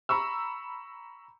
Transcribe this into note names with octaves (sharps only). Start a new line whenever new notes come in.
A#5 B5 C#6 E6